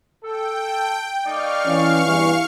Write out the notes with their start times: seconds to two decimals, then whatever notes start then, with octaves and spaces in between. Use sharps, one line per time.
0.24 A4 G5
1.26 A3 D#4 D5 F5 C#6 F6
1.65 E3 C#4
2.05 E2 G2 E3